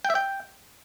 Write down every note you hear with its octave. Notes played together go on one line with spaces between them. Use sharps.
G5
E5
G5